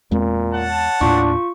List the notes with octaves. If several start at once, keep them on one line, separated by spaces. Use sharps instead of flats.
E2 A#2 G#3 C4
C#5 F#5 A5
D#2 A2 D4 F4 C#6